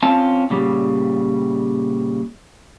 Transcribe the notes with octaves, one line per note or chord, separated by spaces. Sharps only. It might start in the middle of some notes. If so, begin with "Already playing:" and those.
C4 C#4 F4 A5
A#2 C#3 G3